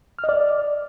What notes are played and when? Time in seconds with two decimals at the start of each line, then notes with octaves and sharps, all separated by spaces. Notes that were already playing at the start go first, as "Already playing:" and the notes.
0.19 F6
0.24 D#5
0.29 D5